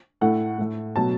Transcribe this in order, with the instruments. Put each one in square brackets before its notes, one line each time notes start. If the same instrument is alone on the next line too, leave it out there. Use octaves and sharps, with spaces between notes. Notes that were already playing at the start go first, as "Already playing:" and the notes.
[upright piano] A2 A3 F#5
A2 A3
B2 F#3 A3 A5